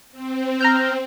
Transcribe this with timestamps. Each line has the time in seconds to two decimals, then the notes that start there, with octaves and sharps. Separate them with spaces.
0.12 C4
0.61 A#5 F6 G6